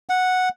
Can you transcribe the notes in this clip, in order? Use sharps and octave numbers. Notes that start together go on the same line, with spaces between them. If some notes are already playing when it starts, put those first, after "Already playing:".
F#5